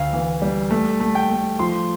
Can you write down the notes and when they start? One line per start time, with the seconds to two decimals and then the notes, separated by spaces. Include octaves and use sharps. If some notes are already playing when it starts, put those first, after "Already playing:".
Already playing: D2 F5
0.13 E3
0.42 G3
0.71 A3
1.00 A3
1.15 G5
1.30 A3
1.59 F3 C6